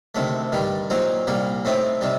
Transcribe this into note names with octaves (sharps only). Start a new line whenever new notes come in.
D2 C3 D#3 A3
G2 D#3 G3
A#2 F#3 C4 D#4
C2 A#2 G3 A#3
A2 A3 C4 D#4
C3 D#3 G3